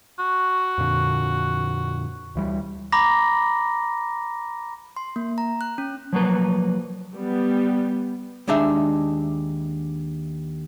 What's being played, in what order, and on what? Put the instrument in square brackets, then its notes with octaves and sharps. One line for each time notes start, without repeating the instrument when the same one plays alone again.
[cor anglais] F#4
[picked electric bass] F2 A#2 D3
D2 E3 G3
[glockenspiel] A#5 B5 D6 A#6
[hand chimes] C6
A#3
A#5
F#6
C#4
[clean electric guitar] F3 F#3 A#3 B4
[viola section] G3 B3
[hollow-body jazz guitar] D#2 G#3 D4 D#4 E5